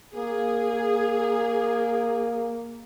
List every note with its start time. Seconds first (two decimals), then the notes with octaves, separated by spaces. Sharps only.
0.16 A#3 G#4